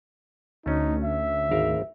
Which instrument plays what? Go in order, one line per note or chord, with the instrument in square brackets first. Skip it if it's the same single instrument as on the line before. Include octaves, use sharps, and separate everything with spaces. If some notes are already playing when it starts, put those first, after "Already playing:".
[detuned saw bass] D2 [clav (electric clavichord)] A3 C#4 [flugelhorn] D#4
[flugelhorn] E5
[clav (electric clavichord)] G#1 A#4 F5